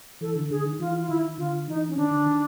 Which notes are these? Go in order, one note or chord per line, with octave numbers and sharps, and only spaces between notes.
E3 A4
D3
D3 G#4
D#3
E3 F4
F4
D#3 E4
D3 F4
E3 D#4
C#4
D#3 D4
D3
D#3